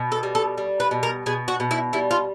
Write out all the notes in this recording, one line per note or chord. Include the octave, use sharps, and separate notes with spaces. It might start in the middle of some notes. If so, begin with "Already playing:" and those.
Already playing: B2
A4
G3
A4
G3
B4
B2
A#4
B2 G#4
F#4
B2
E4
G3 E4
F4